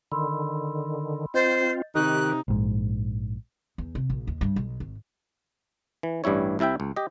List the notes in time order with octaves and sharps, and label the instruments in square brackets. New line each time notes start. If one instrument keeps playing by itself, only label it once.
[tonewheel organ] D3 D#3 [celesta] B5 C6 E6
[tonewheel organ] C4 F4 [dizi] C5 [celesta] D#5 G6 A6
[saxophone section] C3 D#4 [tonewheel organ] D#3 G4 [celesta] C#6 [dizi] F#6
[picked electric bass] A#1 G#2
[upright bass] E2
C3
A#1
D#2
G2
B1
G#1
[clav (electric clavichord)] E3
A1 G2 G3 E4 C#5
C2 C3 E4 E5 G5
C#2
G4 D#5